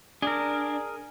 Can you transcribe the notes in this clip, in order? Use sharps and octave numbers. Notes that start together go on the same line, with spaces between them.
D4 G#4 A#4